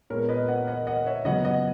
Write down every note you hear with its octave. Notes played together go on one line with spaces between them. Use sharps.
A#2 G#3 B3 A#4 C#5
B4 D#5
D#5 F#5
D#5 F#5
D#5 F#5
C#5 E5
C#3 F#3 B3 D#5 F#5
D#5 F#5